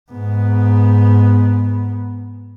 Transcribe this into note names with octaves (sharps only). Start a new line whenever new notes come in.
G#2 B3